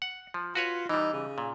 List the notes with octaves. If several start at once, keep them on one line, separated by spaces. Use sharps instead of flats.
F#5
F3
F4 F#4 B4 C#5
E3 G3 D#4
C#3
A#2